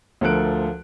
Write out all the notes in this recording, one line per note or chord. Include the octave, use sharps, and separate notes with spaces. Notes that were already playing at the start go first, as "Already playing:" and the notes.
D2 F3 A4 A#4 F#6 D7